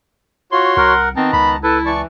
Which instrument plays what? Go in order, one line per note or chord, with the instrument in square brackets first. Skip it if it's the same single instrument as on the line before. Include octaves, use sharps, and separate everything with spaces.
[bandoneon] F4 [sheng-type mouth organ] F#4 C#5 [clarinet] C6
[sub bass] C2 [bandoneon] A#4 F#5
[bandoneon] D#3 B3 [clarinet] C4 [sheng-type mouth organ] A5 A#5
[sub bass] C#2 [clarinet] B5
[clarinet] E4 [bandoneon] A4 B4 [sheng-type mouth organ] A5
[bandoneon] E3 [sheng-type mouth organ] D5 A5 C#6